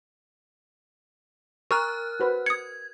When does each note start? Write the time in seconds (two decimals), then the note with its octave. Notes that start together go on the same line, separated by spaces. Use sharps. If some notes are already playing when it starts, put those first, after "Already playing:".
1.71 A#4 A#5 C#6 F6 F#6
2.20 F#4 B4 C5
2.46 D#6 G#6 C#7